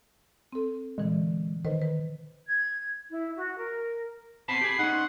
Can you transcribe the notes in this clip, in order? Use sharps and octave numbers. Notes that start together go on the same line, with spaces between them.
C4 A4
A#2 D3 E3 G#3
D#3 B4 C5 D#5
B4
G#6
E4
F#4
A#4
B3 C4 A5 B5 C7
G4 G#4
C#4 D#4 F#5
C6